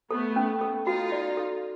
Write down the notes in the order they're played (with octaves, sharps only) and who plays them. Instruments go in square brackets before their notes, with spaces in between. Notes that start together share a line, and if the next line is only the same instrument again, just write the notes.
[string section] A3 B3 [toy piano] A4
[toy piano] C#4
A4
[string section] D#4 F4 [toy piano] F#4
[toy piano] D5
A4